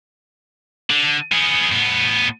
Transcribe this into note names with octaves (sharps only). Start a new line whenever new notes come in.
D3
B3 G#4
A2 B3